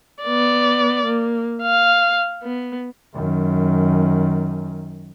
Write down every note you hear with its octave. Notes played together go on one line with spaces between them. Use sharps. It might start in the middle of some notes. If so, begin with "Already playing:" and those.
B3 D5
A#3
F5
B3
F#2 D#3